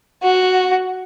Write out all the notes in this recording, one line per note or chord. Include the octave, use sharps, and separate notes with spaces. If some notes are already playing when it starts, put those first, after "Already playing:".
F#4